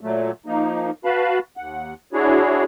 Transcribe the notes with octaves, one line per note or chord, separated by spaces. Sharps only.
A#2 F#3 A3
F3 A#3 D#4
F#4 B4 F5 A5 B5
D#2 F#5
D4 E4 F#4 G#4 C#5